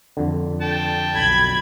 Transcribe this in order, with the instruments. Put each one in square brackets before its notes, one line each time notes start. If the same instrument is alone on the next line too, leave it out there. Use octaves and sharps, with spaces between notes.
[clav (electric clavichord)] F2 D3
[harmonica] G5 A5
[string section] B1 B5 G#6